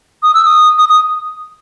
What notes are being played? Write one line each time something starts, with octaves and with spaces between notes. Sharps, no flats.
D#6
E6
D#6
D#6
D#6